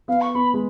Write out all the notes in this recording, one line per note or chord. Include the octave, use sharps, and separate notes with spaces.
B3 F5
C#6
B3 B5
G#3